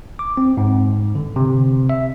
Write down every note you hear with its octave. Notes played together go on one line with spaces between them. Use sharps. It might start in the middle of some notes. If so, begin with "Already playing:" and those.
D6
C4
G#2
D3
C3
E5